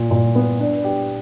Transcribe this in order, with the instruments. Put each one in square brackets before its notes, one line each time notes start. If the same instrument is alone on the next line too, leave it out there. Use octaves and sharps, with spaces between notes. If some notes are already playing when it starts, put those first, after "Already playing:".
Already playing: [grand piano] A#2
A#2
B3
D4
G4